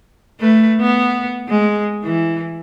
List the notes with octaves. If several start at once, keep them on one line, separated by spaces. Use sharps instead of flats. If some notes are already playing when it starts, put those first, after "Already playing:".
A3 B4
B3
G#3
E3